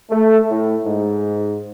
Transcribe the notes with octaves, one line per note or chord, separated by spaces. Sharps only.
A3
A2
G#2